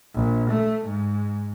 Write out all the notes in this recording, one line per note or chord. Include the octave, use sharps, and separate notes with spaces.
A#1
A3
G#2